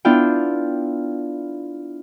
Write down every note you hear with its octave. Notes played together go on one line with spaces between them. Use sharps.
B3 D4 E4 F4 G5